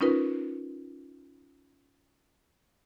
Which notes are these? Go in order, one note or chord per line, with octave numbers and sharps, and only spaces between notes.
C#4 D#4 F4 A#4 B4